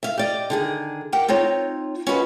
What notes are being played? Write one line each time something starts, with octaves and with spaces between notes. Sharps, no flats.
E5 F5
G4 D5 D#5
D3 D#3 G#4
G4 A#4 F#5 G5
C4 D#4 F4 C#5
C#4 F4 F#4 G#4 B4 D#5